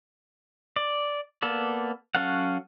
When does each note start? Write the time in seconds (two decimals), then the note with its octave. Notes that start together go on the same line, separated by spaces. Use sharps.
0.76 D5
1.42 A#3 B3 A4 D5
2.15 F#3 C#4 A4 F5 F#5